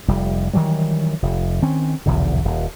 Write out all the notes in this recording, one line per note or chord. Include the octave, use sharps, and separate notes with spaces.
F1 G3
D#3 E3 F#3 G3
F1
D#3 C4 C#4
F1 B1 E2 D3
D#1